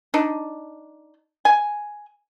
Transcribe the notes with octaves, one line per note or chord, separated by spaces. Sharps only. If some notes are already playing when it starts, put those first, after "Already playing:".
D4 D#4
G#5